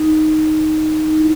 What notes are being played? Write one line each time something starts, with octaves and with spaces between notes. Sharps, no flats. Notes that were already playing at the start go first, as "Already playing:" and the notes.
Already playing: D#4
D#4
E4